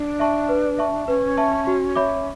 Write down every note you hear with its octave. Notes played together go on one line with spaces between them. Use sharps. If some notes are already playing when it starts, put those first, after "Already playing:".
Already playing: D4
E5 A5 C#6
B4
E5 A5 C#6
C#4 B4
E5 A5 C#6
F#4
C#5 E5 B5 D6